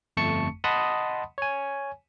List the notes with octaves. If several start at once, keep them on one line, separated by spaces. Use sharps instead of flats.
G1 F2 A3 A5 C#6 C#7
D#5 F#5 A5 B5 C6 D#6
C#5 G#5